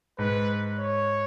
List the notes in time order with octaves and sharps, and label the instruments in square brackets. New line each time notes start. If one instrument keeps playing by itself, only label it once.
[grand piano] G#2 [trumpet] B4
[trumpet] C#5